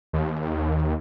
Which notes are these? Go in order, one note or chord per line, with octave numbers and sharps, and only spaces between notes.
D#2